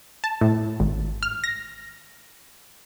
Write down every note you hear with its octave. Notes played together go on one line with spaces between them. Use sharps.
A5
A2
G#1
F6
A#6